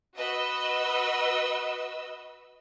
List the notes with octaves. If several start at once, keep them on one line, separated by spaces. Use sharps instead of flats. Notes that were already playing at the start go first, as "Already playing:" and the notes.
F#4 B4 D#5 E6